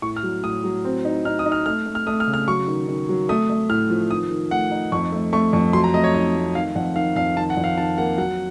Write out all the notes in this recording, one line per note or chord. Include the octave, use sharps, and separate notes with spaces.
A2 C#6
F6
F#3
A2 D#6
F#3
C4
D#4
D#4 F6
D#6
D#4
F6
A3 F6
A3
F6
A3 D#6
F6
C#3
F6
F#3 C#6
D#3
D#3
F#3
A3 D#6
A3
A2 F6
F3
D#3 D#6
D#3
A3 F#5
D#4
F2 C#6
A3
A3 C#6
F2 C#6
F#3 C6
A#5
A3 D#5
C#5
D#4 D#5
A3
D#3 F5
F2 F#5
D#3 F5
F2 F5
D#3 A5
F#5
F2
F5
D#3 A5
A#3 F#5
F#3 F#5